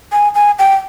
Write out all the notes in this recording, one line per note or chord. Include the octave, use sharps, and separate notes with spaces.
G#5
G#5
G5